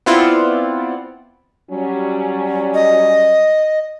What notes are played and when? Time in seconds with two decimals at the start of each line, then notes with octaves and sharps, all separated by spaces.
0.06 B3 C4 E4 F4 D5 F#5
1.71 F#3 G3 C#4
2.74 D#5